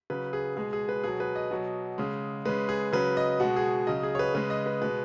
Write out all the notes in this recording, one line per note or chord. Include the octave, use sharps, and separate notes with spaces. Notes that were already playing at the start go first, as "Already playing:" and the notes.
C#3 F#3 B4
G#4
B2 G#3 G#4
G#4
B4
B2 F#3 G#4
B4
D#5
B2 F#3
C#3 G#3
C#3 G#3 B4
G#4
C#3 F#3 B4
D#5
B2 G#3 F#4
G#4
C#3 F#3 D#5
G#4
C#5
B4
C#3 G#3 B4
D#5
B4
B2 G#3 B4